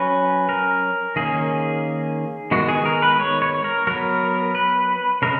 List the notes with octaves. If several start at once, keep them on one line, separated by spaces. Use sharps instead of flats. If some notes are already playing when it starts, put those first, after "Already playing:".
Already playing: F#3 C#4 B4
A#4
D#3 A#3 C#4 G#4
D#3 G#3 B3 F#4
G#4
A#4
B4
C#5
C#5
A#4
F#3 B3 A#4
B4
C#3 G#3 A#4